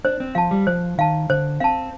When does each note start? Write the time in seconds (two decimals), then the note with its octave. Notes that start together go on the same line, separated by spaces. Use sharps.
0.04 D4 C5
0.20 C4
0.35 F3 F5 A5
0.51 G3
0.67 F3 C5
0.98 D#3 F5 A5
1.30 D3 C5
1.60 C4 F5 A5